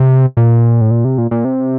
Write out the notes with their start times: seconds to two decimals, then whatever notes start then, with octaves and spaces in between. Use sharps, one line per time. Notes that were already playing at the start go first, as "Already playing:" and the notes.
Already playing: C3
0.37 A#2
0.81 A2
0.91 A#2
1.05 C3
1.18 A#2
1.31 A#2
1.45 C3